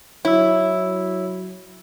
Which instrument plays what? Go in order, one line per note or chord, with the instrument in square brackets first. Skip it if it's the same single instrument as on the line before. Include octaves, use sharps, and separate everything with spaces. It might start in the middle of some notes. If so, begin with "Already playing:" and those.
[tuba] F#3 [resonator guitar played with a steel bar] E4 [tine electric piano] C#5 E6